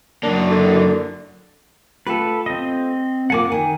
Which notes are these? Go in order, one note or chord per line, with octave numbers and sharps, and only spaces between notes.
F#2 A#3 D4
D3
A3 F4 G4 A4 B4
C4 D#5
C3 A#3 F4 F#5 G#5 D6
D#3 G#5